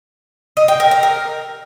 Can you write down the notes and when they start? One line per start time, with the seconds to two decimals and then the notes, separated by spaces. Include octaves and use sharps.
0.57 D#5
0.68 G5
0.80 A#4
0.91 A#5
1.03 A#4